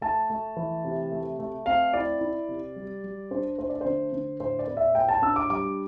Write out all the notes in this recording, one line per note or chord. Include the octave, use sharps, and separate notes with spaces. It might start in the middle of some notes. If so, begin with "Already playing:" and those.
A3 A5
A3
E3
C3
A3
A3
C4 F5
E4 D5
E4
C3
G3
G3
D4 C5
A3 C5
D5
D3 C5
D3
A2 C5
D5
B3
E5
A2 G5
A5
D4 E6
D6
G3 D6